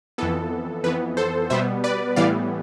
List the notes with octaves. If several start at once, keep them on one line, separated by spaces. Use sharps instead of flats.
F2 E3 B3 A4
F2 E3 B3 B4
A4 C5
B2 G3 B3 C5 E5
B4 D5
A2 E3 G3 B3 D5 F5